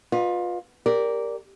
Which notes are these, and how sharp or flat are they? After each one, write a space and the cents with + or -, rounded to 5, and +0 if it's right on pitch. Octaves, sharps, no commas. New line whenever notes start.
F4 +25 B4 -15 D#5 -30
G4 +20 A#4 +0 D5 -10